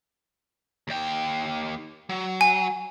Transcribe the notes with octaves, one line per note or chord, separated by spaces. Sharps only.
D#2 G5
F#3
G#5